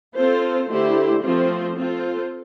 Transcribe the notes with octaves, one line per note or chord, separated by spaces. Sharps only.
C4 F4 A4 C5
D3 A3 E4 G4 C5
F3 A3 C4 F4 C5
C4 F4 A4 C5